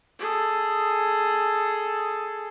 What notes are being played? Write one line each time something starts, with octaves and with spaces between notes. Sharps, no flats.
G#4 A4